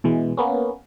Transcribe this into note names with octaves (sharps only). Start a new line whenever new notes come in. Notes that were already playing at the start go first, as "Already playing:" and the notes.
B2 E3 G#3
A#3 B3 C#4